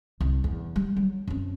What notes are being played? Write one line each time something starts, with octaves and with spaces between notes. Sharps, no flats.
C2
E2
G3
F#3
F#2 C4